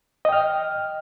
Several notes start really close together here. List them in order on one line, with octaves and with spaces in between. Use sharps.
D#5 G5 F6